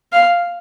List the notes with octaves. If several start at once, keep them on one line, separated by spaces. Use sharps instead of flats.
F5